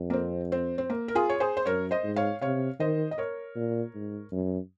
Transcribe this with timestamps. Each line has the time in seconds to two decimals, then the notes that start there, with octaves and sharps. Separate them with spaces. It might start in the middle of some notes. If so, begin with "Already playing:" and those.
Already playing: F2
0.10 A#3
0.13 C4
0.52 C4
0.78 C4
0.90 A#3
1.08 A#4
1.15 F4 G#4
1.29 C#5
1.40 G#4 C5
1.57 C5
1.65 F#2 A#4 C#5
1.91 C5 D#5
2.04 G#2
2.16 C#5 F5
2.41 C3 C#5 F5
2.80 D#3 C5 D#5
3.11 D#5
3.18 A#4 C#5
3.56 A#2
3.95 G#2
4.32 F#2